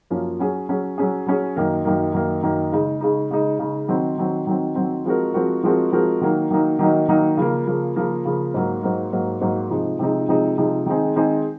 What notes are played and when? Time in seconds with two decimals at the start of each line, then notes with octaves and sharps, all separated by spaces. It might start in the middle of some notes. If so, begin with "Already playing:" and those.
0.10 F#2 F3 A#3 C#4
0.39 F#3 C#4 G#4
0.69 F#3 C#4 G#4
0.98 F#3 C#4 G#4
1.27 F#3 C#4 G#4
1.56 F#2 D#3 A#3
1.85 F#2 D#3 A#3
2.13 F#2 D#3 A#3
2.43 F#2 D#3 A#3
2.73 C#3 G#3 D#4
3.01 C#3 G#3 D#4
3.31 C#3 G#3 D#4
3.59 C#3 G#3 D#4
3.88 D#3 F#3 C4
4.18 D#3 F#3 C4
4.47 D#3 F#3 C4
4.75 D#3 F#3 C4
5.05 F3 G#3 C4 F#4 A#4
5.34 F3 G#3 C4 F#4 A#4
5.64 F3 G#3 C4 F#4 A#4
5.92 F3 G#3 C4 F#4 A#4
6.21 D#3 F#3 A#3 D#4
6.51 D#3 F#3 A#3 D#4
6.79 D#3 F#3 A#3 D#4
7.08 D#3 F#3 A#3 D#4
7.37 C#3 F3 A#3
7.67 C#3 F3 A#3
7.96 C#3 F3 A#3
8.25 C#3 F3 A#3
8.54 G#2 F#3 A#3
8.83 G#2 F#3 A#3
9.13 G#2 F#3 A#3
9.41 G#2 F#3 A#3
9.71 C3 F3 G#3 D#4
9.99 C3 F3 G#3 D#4
10.29 C3 F3 G#3 D#4
10.58 C3 F3 G#3 D#4
10.86 D#3 G#3 C4 D#4 G#4
11.16 D#3 G#3 C4 D#4 G#4